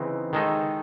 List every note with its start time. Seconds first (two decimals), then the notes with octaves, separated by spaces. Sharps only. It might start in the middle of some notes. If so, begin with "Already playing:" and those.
Already playing: C#3 E3 C4 D#4
0.33 D#3 G#3 D#4 A4 D#5